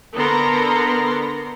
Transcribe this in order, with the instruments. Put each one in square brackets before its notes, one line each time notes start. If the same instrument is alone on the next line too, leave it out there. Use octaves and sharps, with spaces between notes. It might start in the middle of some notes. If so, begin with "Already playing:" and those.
[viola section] D3 B3 A4 A#4 A#5 C6